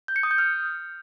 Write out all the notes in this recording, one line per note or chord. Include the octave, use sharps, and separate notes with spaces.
G6
C#7
D#6
G6
F6